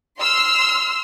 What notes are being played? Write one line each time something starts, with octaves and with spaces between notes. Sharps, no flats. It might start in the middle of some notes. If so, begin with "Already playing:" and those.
C6 E6 F6